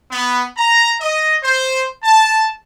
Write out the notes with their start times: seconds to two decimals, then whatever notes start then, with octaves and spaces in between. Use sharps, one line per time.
0.11 B3
0.57 A#5
1.00 D#5
1.43 C5
2.04 A5